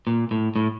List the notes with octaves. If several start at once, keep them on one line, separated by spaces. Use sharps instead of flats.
A#2
A2
A2